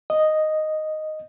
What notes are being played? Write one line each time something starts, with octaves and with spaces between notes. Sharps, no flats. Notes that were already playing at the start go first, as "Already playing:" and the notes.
D#5